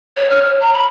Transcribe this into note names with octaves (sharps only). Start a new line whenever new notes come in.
C#5
F6
C#5
A#5
B5